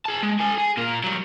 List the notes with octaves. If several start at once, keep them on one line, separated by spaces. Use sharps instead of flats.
G#4 A5
G#3
A4 G#5
G#4
A#2 A#4
F#3 G3